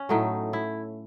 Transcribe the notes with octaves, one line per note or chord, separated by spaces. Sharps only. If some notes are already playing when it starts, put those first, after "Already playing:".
Already playing: C#4
A2 F#3 A3 D#4
E4